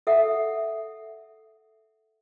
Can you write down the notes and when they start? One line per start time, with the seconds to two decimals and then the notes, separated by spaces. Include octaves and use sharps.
0.07 A4 E5 F#5